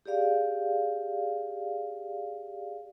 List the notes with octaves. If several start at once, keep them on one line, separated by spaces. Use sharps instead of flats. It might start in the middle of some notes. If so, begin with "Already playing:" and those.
G4 G#4 D5 F5